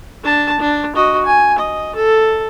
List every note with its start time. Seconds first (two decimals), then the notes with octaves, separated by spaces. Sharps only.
0.24 D4 A5
0.60 D4
0.96 F#4 D#5
1.26 G#5
1.59 D#5
1.95 A4